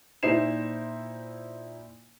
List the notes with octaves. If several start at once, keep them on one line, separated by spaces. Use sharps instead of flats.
A#2 D#4 E4 C5 C7 E7